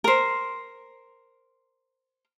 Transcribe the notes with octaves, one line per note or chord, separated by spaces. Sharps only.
A#4 C5